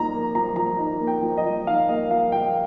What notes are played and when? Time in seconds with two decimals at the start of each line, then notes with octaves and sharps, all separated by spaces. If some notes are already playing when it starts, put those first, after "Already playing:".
Already playing: F3 D#4 A#5
0.12 A#3
0.35 F3 A#5
0.56 F3 A#5
0.78 D#4
1.00 A#3
1.07 G5
1.23 F3
1.38 D#5
1.45 F3
1.67 D#4 F5
1.89 A#3 D#5
2.10 F3 F5
2.32 F3 G5